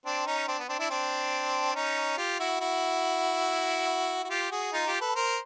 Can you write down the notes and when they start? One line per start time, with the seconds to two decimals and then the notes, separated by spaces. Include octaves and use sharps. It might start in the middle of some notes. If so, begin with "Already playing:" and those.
0.06 C4 D4
0.26 C#4 D#4
0.48 C4 D4
0.59 B3
0.69 C4 D4
0.79 D4 E4
0.90 C4 D4
1.75 C#4 D#4
2.18 F4 G4
2.39 E4 F#4
2.60 E4 F#4
4.24 F#4
4.30 F4 G4
4.51 F#4 G#4
4.73 D#4 F4
4.87 F4 G4
5.01 A4 B4
5.15 A#4 C5